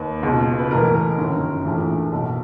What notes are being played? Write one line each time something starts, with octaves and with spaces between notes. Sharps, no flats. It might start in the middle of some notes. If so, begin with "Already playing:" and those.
Already playing: D#2 B4
C#2 B2
B4
B1 A2 E3 A#4
G1 F#2 D#3
A#1 A2 E3
B1 B2